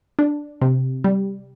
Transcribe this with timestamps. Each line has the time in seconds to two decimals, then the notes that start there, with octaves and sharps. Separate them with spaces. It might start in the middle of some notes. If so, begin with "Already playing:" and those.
0.19 D4
0.61 C3
1.04 G3